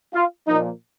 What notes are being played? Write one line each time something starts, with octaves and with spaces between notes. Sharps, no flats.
F4
A#2 F3 A#3 D#4